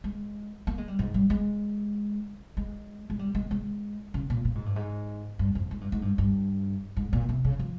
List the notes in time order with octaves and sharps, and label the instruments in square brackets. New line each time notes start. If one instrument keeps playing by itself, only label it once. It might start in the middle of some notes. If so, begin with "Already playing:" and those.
[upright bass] G#3
A#3
G#3
G3
G#2
G3
G#3
G#3
G#3
G3
G#3
G#3
C#3
A#2
A#2
G#2
G2
G#2
G2
F2
G#2
G2
G#2
G2
G2
G#2
A#2
C3
C#3
F3